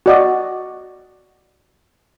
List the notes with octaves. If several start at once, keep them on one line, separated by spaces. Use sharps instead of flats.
F#4 D5 D#5